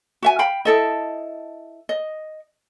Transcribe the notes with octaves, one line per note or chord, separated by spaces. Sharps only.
F#4 E5 G#5
F5 G5 B5
E4 A4 D#5
D#5